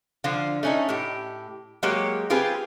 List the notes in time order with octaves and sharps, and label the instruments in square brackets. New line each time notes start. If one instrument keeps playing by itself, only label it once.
[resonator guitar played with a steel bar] D3 F3 F4
A3 C#4 D#4
A2 G4
F#3 G#3 A#3 G4 C#5
C4 F4 G4 G#4 B4